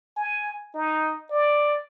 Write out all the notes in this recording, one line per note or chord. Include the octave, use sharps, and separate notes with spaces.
G#5
D#4
D5